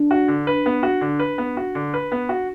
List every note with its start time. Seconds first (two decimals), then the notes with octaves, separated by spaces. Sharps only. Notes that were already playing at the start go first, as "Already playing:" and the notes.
Already playing: D4
0.11 F#4
0.28 D3
0.47 B4
0.66 B3
0.83 F#4
1.01 D3
1.19 B4
1.38 B3
1.57 F#4
1.75 D3
1.94 B4
2.12 B3
2.29 F#4